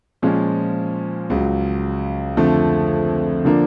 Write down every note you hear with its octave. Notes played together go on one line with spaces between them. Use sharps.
A#2 F3 G#3 C#4
C#2 C#3 F#3
F2 D3 F3 A3
D3 F3 A#3 D4